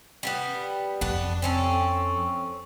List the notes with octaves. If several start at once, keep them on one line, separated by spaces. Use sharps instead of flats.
G3 A#3 B3
F2 B3 D4
C4 C#4 A4